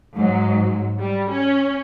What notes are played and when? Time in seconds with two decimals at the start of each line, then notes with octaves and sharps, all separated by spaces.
0.15 G#2 F#3
1.00 G3
1.32 C#4